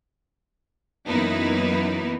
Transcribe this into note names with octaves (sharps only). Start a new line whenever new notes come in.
F#2 E3 A#3 B3 D#4 E4